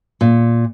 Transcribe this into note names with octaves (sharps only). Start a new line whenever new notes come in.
A#2